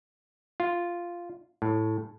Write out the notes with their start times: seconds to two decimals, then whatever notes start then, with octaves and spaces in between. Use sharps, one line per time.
0.60 F4
1.62 A2